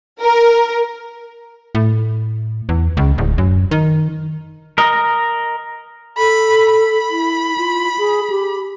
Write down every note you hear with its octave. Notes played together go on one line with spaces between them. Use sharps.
A#4
A2
E2
C#2
D1
F#2
D#3
A#4 D#5
A4 B5
B5
E4
F4
G#4
G4